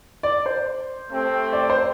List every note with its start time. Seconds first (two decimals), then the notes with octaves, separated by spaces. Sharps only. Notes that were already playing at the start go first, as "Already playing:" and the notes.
0.23 D5
0.46 C5
1.10 A3 C4 G4
1.53 D5
1.70 C5
1.74 D5